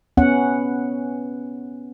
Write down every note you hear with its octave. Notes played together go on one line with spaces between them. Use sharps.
B3 C#4 F#5